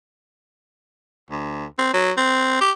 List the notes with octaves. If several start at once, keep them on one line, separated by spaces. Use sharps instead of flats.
D2
C4
F#3
C4
G4